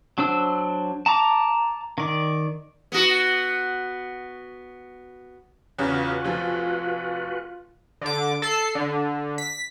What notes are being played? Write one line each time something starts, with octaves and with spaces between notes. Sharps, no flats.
F#3 D4 C5 E6
A5 A#5 D6
D#3 D5
B3 F#4
E2 C#3 F4 F#4 B4
F1 F3 G#5
D3 D6
A4 C7
D3
B6